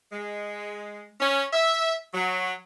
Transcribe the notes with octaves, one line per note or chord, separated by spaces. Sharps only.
G#3
C#4
E5
F#3